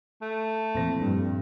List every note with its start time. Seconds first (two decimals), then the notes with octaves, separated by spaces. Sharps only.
0.21 A3
0.75 F2 A#2 E3 A#6
1.03 G2